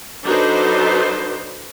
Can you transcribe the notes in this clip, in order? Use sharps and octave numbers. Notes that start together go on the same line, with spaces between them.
F#3 D4 D#4 A4 B4 C5